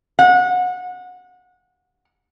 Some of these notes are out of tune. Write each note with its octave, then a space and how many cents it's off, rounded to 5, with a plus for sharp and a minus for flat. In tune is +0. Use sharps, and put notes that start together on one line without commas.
F#5 -25